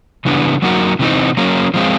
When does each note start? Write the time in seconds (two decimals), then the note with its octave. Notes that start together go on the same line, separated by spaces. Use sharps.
0.25 C#3 E3 G3 B3 D4
0.62 F#3 A#3 D#4 F#4 A#4
0.99 C3 E3 A3 C4 D#4
1.37 F#3 A#3 C#4
1.74 F3 G#3 C4 F4